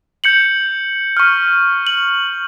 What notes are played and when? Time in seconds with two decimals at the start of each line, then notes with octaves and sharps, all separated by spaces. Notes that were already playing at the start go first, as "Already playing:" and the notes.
0.24 G6 C#7 F#7
1.17 C#6 F6
1.87 F#7